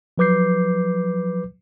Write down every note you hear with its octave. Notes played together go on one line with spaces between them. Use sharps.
F3 F#3 B4 D6 G6 C7